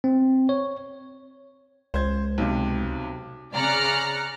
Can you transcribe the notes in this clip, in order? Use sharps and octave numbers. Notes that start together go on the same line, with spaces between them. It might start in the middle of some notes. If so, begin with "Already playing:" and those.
C4
C#5
C#2 C5 G#6
B1 C3
C#3 D5 A#5 F6 F#6 C#7